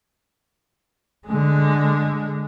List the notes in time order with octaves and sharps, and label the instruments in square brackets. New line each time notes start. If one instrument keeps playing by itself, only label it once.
[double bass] D3 G#3